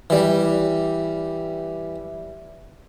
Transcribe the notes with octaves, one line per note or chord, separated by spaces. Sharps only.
E3 G3